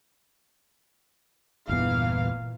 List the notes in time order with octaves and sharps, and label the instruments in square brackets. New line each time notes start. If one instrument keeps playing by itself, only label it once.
[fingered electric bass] G1 E2 B3 [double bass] A#2 [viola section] E3 F5